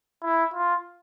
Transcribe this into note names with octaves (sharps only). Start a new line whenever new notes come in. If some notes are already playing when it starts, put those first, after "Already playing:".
E4
F4